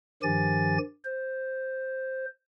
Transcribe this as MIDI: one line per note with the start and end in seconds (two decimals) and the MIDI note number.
0.23 0.78 43
0.23 0.78 51
0.23 0.78 53
0.23 0.78 67
0.23 0.78 80
0.23 0.78 93
1.04 2.25 72